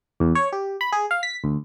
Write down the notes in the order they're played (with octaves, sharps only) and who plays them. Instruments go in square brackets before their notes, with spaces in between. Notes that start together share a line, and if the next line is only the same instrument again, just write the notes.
[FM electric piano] E2
C#5
G4
B5
G#4
F5
B6
D2